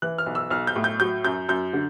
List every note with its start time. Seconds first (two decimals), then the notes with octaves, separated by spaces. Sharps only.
0.02 E3 F#6
0.18 F6
0.26 B1
0.35 E6
0.50 B1 F6
0.67 G6
0.76 A2
0.84 G6
1.00 F#3 G6
1.24 F#2 G6
1.48 F#2 G6
1.73 D3